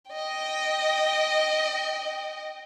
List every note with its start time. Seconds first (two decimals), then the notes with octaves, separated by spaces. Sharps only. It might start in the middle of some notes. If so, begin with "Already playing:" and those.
0.11 D#5 G5